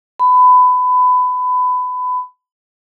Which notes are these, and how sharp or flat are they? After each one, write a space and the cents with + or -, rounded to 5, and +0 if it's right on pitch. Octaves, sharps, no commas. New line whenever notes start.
B5 +25